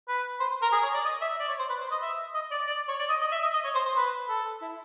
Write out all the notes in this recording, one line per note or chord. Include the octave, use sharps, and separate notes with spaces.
B4
C5
A#4
G#4
C#5
D5
D#5
E5
D5
C#5
C5
B4
C5
D#5
E5
D#5
D5
D5
C#5
D5
D#5
D#5
E5
D#5
D#5
C#5
C5
C5
B4
A4
E4